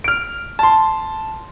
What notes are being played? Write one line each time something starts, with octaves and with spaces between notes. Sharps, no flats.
F6 D7
A5 C6